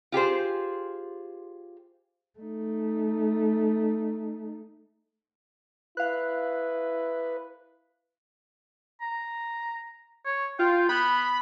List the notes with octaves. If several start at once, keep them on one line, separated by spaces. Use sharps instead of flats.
F4 G4 G#4 C5
A3 D#4
E4 B4 F5 F#6
A#5
C#5
F4 G5
B3 B5